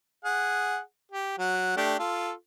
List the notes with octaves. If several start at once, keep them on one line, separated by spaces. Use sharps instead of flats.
G#4 F#5
G4
F#3 F#5
A3 D4 G4
F4 A4